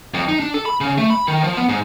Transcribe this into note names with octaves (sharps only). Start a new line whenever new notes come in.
F2
D#4
D4
A4
B5
C#3
A3
B5
D#3
F3
B3
G#2